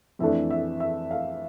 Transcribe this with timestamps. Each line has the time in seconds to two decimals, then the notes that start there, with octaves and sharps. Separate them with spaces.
0.19 F2 E3 A3 D4 E5
0.50 E5
0.80 E5
1.11 F5